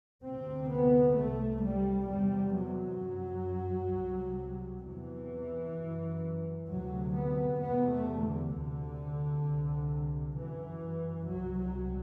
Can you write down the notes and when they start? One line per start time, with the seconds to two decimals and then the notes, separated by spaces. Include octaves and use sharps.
0.24 D2 C3 C4
0.70 B3
1.16 C2 C3 A3
1.63 G3
2.08 E2 C3 G3
2.54 F#3
3.00 F#2
3.93 C2 C3
4.84 E2 C3 E3
5.77 F#2
6.68 D2 C3 F#3
7.14 B3
7.60 E2 C3 B3
7.91 A3
8.22 D3
8.52 D2 C3
9.44 C2 C3
10.36 F#2 E3
11.29 C2 C3 F#3
11.60 F#3